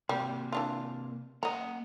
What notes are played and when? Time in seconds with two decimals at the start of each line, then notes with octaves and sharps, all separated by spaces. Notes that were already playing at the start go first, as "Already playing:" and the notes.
0.09 C3 G3 A#3
0.52 E3 D4 F4
1.43 A#3 D#5 F#5 A#5